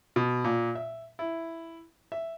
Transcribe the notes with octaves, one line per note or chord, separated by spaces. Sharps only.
B2
A#2
E5
E4
E5